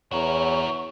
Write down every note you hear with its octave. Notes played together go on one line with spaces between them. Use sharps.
E2 F#4 A#4 C#5 C#6